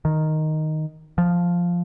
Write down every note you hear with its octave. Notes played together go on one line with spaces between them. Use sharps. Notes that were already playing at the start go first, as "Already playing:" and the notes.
D#3
F3